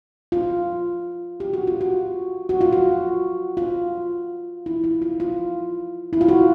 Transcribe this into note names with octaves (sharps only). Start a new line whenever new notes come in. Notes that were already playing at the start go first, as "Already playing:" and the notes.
F4
G4
F#4
F4
F#4
F#4
F4
F#4
F4
E4
E4
F4
F4
E4
F4
F#4